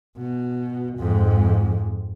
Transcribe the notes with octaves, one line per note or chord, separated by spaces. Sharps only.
B2
F2 G#2